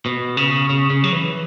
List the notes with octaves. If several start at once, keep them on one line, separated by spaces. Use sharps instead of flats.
B2
C#3
C#3
C#3
F#3
E3